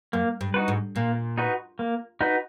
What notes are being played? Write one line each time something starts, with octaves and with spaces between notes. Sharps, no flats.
F#2 A#3
G2
D#4 F#4 B4
G#2
A#2 A#3
D#4 F#4 B4
A#3
D#4 F#4 B4